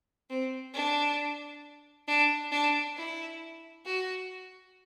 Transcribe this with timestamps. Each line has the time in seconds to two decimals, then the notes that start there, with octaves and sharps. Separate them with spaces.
0.30 C4
0.74 D4
2.08 D4
2.51 D4
2.97 E4
3.85 F#4